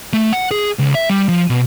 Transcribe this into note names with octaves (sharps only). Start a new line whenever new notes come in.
A3
F#5
G#4
C#2
E5
G3
F3
B2